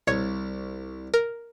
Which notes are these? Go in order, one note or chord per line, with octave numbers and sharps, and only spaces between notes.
C2 C#5
A#4